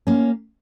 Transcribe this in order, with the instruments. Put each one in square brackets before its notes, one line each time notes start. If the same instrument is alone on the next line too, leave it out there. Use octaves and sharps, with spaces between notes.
[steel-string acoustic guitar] A#3 C#4